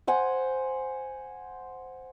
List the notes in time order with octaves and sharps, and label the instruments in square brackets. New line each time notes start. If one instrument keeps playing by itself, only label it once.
[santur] C5 F#5 G#5